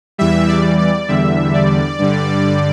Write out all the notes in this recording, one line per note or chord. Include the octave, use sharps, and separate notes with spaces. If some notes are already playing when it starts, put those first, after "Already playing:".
E2 E3 G3 E5
D5
D5
E2 D3 G3 E5
D5
G2 D3 G3